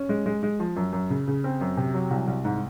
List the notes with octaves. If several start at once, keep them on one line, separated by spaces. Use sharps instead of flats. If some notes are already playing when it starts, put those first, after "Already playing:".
Already playing: C#4
G#3
G#3
G#3
F3
F#2
F#2
C#3
C#3
C4
F#2
C3
F#3
C2
C2
G#2